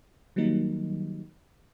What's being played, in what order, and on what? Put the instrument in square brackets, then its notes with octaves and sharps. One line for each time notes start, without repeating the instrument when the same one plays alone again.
[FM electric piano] D#3 F#3 G3 A#3 D#4